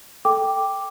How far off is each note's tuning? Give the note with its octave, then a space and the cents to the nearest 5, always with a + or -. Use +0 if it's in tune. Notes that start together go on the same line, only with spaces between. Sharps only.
A4 +0 G5 +0 D6 +0